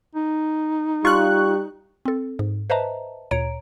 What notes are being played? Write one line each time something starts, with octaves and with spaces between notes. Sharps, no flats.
D#4
G3 F4 C#6 F#6
C4 A4
G#2
B4 C5 D#5 E5 A5 A#5
D2 A#2 C#5 A#5 D7